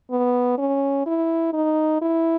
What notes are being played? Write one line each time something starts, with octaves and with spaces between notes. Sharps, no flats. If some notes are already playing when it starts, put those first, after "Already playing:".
B3
C#4
E4
D#4
E4